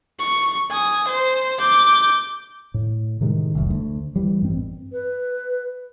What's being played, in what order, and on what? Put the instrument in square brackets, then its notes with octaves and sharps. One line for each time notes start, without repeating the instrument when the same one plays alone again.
[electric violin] C#6
G#5 D#6
C5
D6 G6
[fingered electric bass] A2
A2 C3 D#3 G#3
F1 C2
D2
E3 G3
A1 G2 C4
[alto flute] B4